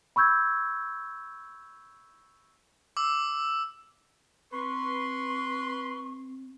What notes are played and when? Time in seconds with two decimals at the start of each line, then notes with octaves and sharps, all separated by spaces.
0.16 B5 C#6 E6 G6 G#6
2.97 D6 E6
4.52 C4 B4 C6 C#6